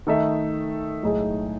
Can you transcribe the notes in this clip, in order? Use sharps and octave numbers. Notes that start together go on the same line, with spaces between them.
D#3 A3 D#4 A4 E5
B1 A2 G#3 D#4 G#4